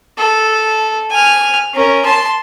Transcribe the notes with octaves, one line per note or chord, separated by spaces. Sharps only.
A4
G#5 F6
C#4 A#4
A5 C6